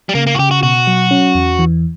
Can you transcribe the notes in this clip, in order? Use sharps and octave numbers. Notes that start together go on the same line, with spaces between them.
G3
C#3 A#3
A#3
F#4
C#3 G4
F#4
B2 F#4
F#3
C#4
E2
E3